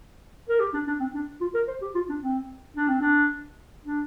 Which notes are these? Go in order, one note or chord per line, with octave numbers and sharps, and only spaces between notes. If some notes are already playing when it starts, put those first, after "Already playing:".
A#4
G4
D4
D4
C4
D4
F4
A#4
C5
G4
F4
D4
C4
D4
C4
D4
D4